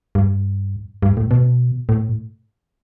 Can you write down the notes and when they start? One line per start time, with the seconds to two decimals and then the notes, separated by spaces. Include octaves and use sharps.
0.15 G2
1.02 G2
1.17 A2
1.31 B2
1.89 A2